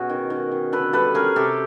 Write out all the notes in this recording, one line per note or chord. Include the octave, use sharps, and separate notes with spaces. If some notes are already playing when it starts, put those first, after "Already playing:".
Already playing: B2 C#4 F#4 G#4
D#3
D#3
D#3
D3 A4 B4
G3 A4 B4
C#4 G#4 A#4
C3 G4 A4